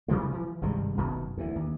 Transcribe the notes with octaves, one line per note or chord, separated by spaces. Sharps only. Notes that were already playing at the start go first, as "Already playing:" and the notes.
C3 E3 G3 G#3
E3 F3
G#1 G2 C3 G#3
F#1 F#2 B2 D#3
D2 E3
D#2